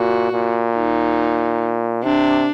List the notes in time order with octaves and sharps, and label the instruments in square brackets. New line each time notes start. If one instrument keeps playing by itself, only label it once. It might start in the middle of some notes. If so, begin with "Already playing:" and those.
Already playing: [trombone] A#2 [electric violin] F#4
[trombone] A#2
[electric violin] D#4
[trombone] C3 [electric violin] D4